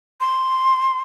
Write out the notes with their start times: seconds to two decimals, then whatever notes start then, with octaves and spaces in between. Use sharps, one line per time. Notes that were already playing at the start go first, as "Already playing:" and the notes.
0.21 C6